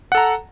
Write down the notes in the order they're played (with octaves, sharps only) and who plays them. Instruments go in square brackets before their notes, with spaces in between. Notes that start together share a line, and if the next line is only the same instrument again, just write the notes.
[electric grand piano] F#5
A4
A#5